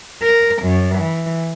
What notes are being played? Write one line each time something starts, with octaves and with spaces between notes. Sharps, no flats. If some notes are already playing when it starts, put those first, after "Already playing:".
A#4
F#2
E3